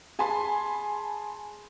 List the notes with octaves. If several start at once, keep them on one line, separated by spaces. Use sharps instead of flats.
G#4 G#5 A5 B5 C6